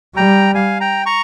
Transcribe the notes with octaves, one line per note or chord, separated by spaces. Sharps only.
G3 G5 A#5
F5 G#5
G5 A#5
A#5 C#6